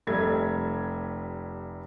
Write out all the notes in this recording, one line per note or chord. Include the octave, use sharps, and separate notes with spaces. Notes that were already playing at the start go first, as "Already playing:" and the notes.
F1 G3 A3 G#6